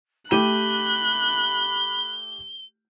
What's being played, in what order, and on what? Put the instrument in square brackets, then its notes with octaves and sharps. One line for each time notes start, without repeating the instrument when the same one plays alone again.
[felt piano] A3 G4 D#7 [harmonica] B5 [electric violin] F#6 [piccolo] G7